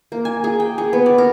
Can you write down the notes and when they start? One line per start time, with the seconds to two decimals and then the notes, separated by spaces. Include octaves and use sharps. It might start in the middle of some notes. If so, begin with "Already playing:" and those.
0.12 A#3
0.25 G#5
0.44 G#4
0.60 G5
0.78 G#4
0.93 B3
1.06 D5
1.18 A#4